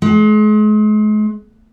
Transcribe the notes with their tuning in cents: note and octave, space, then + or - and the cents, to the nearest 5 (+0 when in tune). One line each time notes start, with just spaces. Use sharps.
G#3 +40